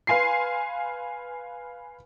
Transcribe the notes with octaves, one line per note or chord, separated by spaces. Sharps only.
B4 F5 G#5 C6 C7